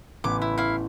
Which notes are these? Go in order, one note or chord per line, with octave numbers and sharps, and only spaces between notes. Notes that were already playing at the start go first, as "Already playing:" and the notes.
A1 B3 C#4 D6
E4
E4 F5